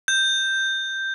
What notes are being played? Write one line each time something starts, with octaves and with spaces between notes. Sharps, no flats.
G6